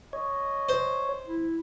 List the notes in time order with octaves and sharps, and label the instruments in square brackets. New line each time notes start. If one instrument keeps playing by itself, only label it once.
[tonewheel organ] C#5 [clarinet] D#5
[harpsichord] C5
[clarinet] E4